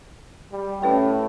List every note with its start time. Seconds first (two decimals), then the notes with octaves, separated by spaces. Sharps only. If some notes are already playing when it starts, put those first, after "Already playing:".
0.52 G3
0.82 A2 C#4 B4 G5